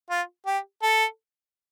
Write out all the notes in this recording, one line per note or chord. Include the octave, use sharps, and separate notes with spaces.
F4
G4
A4